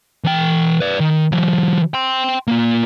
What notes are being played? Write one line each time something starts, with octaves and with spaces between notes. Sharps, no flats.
E3 G5
B4 D5
D#3
E3 F#3
G5 C6
A#3 F4